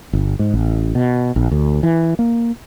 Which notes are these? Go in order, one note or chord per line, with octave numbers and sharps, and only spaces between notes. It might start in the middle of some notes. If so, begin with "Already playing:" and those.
G1
G#2
A1
B2
A#1
D2
E3
A#3